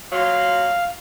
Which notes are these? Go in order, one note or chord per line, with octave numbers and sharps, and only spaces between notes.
A#2 F#3 F5 C6